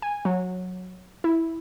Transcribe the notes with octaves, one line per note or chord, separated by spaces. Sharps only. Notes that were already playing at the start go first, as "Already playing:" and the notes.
G#5
F#3
E4